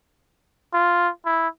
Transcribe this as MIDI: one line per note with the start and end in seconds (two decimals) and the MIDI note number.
0.74 1.09 65
1.26 1.48 64